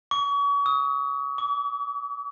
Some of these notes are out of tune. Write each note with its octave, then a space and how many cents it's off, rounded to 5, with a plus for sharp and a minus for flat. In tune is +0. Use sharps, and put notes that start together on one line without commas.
C#6 +40
D#6 +35
D6 -40